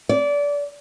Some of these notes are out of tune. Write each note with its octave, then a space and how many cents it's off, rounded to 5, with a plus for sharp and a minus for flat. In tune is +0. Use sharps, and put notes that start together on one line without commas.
D5 -25